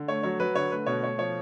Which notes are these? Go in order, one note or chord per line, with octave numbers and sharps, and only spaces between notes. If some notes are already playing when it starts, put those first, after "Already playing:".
Already playing: D3
A3 C#5
F#3 C#5
F#3 B4
D3 C#5
A3 B4
B2 C#5
A3 C#5
F3 C#5